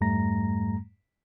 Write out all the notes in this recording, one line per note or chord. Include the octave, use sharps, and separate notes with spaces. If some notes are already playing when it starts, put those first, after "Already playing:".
F2 G#2 G3 A3 A#5 A#6